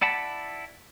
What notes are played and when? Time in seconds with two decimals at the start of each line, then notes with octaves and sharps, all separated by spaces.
0.01 E4 D5 F#5 A5 B5